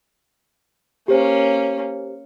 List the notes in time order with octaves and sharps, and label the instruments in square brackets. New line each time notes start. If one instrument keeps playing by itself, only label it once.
[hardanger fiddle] A#3 C#4 [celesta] G4 C5